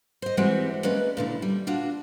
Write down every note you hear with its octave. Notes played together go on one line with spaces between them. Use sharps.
C5 D#5
E3 G3 G#3 C4 F#4 E5
G#3 A#3 C#4 B4 D5
A#2 D3 E4
G3
D4 F4 F#4